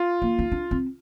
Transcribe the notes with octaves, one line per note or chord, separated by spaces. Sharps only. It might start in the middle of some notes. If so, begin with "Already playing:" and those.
Already playing: F4
A#3
D#4
D4
C4